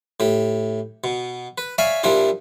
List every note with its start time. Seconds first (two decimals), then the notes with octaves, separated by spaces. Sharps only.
0.20 A2 G4
1.04 B2
1.58 B4
1.78 C#5 D5 E5 F5 G#5 B5
2.03 A#2 F3 G3 D4 E4 G4